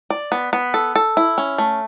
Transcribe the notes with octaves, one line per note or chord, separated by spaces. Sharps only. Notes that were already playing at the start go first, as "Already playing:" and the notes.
D5
B3
B3
A4
A4
E4
C#4
A3